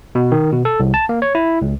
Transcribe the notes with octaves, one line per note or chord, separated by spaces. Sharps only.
B2
D#3
B2
A4
C2
A5
A#3
C#5
E4
C#2